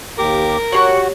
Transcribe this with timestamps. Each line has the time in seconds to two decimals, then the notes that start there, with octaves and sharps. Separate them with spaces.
0.19 D#2 G4 A#4 D6
0.72 F#4 G4 C#5 F#5 C6 C#6